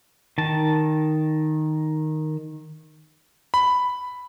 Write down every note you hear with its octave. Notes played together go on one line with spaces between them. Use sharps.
D#3 A5
B5